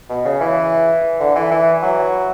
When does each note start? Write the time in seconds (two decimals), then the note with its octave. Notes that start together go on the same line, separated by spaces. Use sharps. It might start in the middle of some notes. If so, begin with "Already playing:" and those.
0.10 B2
0.25 C#3
0.41 E3
1.20 D3
1.36 E3
1.51 E3
1.83 F#3